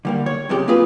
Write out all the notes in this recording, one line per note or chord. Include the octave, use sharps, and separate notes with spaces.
D3 G3 A#3
C#5
F#2 C3 G#3 G4
A#3 C4 F4 G#4 B4